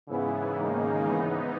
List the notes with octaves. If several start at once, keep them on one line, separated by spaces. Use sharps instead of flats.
G#2 C#3 E3 B3 E4
G#2 D#3 A#3 D#4
G#2 E3 B3 D#4